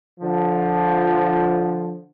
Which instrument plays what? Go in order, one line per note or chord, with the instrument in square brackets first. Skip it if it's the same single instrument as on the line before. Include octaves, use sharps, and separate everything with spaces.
[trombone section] D3 F3